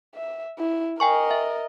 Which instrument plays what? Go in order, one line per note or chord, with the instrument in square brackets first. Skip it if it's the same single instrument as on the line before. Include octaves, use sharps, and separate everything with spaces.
[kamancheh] E5
E4
[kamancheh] A#4 D#5 [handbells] G5 G#5 C#6
[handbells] E5